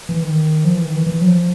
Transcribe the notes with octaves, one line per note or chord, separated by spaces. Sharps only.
E3
D#3
F3
E3
D#3
E3
E3
F#3
F3